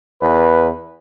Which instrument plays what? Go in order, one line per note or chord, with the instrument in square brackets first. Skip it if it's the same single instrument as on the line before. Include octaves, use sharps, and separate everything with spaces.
[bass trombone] E2 [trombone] B4